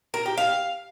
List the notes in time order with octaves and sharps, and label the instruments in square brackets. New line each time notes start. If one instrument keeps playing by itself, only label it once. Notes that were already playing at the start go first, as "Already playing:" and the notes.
[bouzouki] A#4
G4
F5